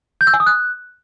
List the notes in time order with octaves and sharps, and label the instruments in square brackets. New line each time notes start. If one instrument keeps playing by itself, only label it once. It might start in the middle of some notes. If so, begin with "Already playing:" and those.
[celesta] G6
E6
G#5
D#6
F#6